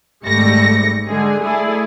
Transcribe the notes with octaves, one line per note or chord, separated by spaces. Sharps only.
G#1 G#2 G3 A3 A#6 C#7
D3 G3 G#3 G#4
A3 E4 G#4 A4 D5